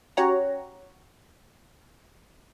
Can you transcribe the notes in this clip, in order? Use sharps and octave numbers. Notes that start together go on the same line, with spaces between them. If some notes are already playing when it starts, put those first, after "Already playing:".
C#4 F#4 G4 C#5 F#5 A#5